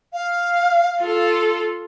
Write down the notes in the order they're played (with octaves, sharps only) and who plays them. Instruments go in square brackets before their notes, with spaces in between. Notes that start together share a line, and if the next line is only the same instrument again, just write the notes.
[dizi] F5
[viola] F4 A4